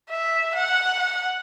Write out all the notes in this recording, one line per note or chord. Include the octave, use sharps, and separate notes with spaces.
E5
F#5
F#5